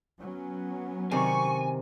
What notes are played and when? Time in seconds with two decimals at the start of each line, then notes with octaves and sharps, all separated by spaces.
0.20 F#3 B3 C#4
1.11 C3 D#3 G#5 C#6